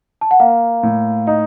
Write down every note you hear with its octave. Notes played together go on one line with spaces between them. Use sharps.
A5
F#5
A#3 F5
A2
D#4 D#5